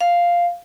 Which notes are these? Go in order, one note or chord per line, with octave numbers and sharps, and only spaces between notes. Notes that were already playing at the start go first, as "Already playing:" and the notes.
F5